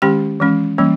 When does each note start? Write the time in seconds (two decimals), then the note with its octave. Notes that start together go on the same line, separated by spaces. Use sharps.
0.02 D#3 G#3 C#4 G4 G5
0.40 E3 G#3 C#4
0.78 E3 G3 A#3 C#4